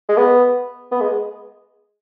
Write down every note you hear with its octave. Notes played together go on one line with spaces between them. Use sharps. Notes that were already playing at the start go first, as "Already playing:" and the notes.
G#3
B3
B3
G#3